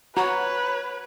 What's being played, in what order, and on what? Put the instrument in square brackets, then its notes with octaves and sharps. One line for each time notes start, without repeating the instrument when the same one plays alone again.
[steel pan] F#4 [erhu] B4 [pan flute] C#5 [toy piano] A#5